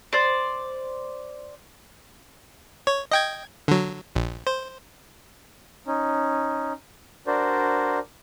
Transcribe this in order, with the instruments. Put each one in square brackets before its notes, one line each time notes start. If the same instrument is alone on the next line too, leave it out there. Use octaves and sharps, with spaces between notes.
[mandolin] C5 D5
[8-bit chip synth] C#5
D#5 G5 G#6
D3 F#3
A#1
C5
[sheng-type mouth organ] C#4 D#4
D4 F#4 A#4 C5 D5